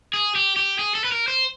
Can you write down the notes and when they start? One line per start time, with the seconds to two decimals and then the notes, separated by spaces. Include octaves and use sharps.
0.14 G#4
0.35 G4
0.56 G4
0.79 G#4
0.95 A4
1.04 B4
1.12 A#4
1.28 C5